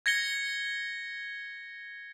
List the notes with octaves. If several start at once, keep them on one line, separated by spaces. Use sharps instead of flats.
G#6 A#6 C#7 G7